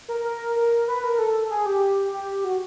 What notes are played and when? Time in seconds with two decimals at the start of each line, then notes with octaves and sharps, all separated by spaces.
0.08 A#4
0.25 A#4
0.56 A#4
0.88 B4
1.04 A#4
1.19 A4
1.50 G#4
1.66 G4
2.13 G4
2.45 F#4